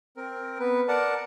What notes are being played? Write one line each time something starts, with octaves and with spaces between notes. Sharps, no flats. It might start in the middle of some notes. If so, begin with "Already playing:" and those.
C4 A#4
B3 B4
A#4 D5 F#5 A5